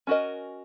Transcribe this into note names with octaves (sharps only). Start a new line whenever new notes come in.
C#4 F#4 A#4 D#5